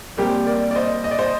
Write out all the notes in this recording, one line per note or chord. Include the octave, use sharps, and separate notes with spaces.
A#1 A#2 G3 C4 G4 A#4
A#4 D5
D5
C5 D#5
D#5
D5
C5 D#5